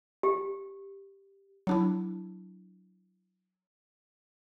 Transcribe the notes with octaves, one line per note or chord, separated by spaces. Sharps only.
G4
F#3 D4 E4